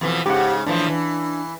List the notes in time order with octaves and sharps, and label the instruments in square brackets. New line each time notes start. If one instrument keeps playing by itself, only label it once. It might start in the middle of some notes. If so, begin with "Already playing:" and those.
[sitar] F2 B2 E3
[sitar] G#2 C#3 [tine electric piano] G4 F#5
[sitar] A2 E3 F3 [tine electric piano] D4
[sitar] E3